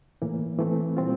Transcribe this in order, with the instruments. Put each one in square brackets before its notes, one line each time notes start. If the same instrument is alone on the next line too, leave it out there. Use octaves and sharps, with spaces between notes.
[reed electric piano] A2 E3 A#3
E3 A3 C4
A#2 G3 C4 F4